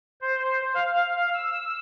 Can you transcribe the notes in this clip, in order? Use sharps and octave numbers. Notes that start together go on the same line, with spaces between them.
C5
F5
E6